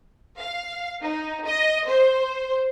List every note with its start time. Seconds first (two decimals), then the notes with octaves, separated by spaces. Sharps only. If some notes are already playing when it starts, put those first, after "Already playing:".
0.39 F5
1.01 D#4
1.45 D#5
1.86 C5